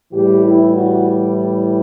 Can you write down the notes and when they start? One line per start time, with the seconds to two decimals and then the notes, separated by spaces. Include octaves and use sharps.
0.13 A2 E3 G3 G4
0.44 E4
0.73 F#4